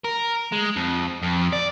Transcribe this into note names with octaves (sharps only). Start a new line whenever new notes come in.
A#4
G#3
F2
F2
D5